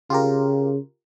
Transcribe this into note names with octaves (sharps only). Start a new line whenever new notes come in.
C#3 F4 G4 A#4